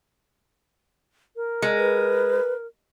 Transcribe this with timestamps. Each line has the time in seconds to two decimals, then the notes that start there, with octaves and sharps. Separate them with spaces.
1.36 A#4
1.62 G#3
1.78 B4